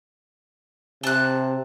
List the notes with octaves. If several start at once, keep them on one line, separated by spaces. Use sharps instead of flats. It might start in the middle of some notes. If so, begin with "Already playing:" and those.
C3 A5 F#6